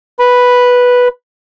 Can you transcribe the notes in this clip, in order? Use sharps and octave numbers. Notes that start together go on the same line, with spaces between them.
B4 B5